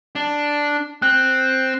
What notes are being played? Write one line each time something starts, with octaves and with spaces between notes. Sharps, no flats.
D4
C4 F#6